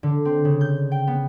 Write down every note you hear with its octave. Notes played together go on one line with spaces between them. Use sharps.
D3
C4
C#3
G6
G5
B3